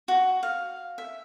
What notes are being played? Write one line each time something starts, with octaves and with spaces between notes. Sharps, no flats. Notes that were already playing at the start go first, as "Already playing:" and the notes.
F#4
F5
E5